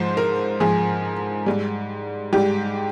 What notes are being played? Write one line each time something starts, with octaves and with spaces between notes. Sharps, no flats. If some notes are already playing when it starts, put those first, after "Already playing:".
Already playing: G#2 F3 C5
A#4
G#2 F3 G#4
G#2 G3
G#2 G3 G4